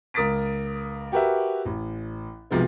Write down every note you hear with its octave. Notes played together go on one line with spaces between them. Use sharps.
C#2 A#4 D#6 A6 B6 D7
F#4 G4 A#4 B4 E5
A1
B1 C3 F3 G#3 B3